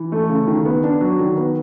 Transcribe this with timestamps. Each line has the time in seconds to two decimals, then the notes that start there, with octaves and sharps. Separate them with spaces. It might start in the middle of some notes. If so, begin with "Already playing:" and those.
Already playing: E3
0.12 A3
0.29 C#3
0.47 D#3
0.65 B3
0.84 D4
1.01 F#3
1.19 D#3
1.37 B3